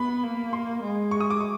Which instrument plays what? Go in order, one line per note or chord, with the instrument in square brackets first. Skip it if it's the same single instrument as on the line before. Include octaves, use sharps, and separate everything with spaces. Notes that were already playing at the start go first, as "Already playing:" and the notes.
Already playing: [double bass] B3 [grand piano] B5
[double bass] A#3
[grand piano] C6
[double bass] G#3
[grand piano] C#6
D#6
D6
C#6